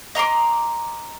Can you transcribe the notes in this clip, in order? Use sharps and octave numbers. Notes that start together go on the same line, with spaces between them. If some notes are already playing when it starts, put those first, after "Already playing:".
D#5 A#5 C6 D6